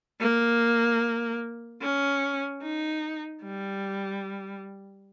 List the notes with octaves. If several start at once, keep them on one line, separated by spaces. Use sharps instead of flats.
A#3
C#4
D#4
G3